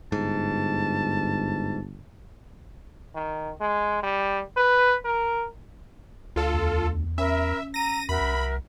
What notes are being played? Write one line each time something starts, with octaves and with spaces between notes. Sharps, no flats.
G1 G#2 A5
D#3
G#3
G3
B4
A#4
D2 F4 A4
E2
C#4 A#4 E5 B5 E6
A#5 E6 A#6 D#7
E2 F#4 A#4 E5 B5
C2